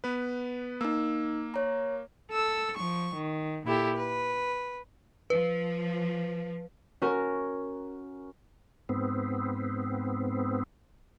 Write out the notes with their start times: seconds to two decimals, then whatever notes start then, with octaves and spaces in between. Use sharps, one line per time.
0.04 B3 B4
0.81 A#3 D#4 E6
1.54 C#5 A#5
2.30 A4 E6
2.76 F3 C#6
3.15 D#3
3.66 A#2 E4 G4 A4
3.96 B4
5.30 F3 B4
7.02 C#4 F#4 A#4
8.89 G#2 B3 C4